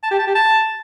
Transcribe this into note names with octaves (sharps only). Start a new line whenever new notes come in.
A5
G4
A5
G4
A5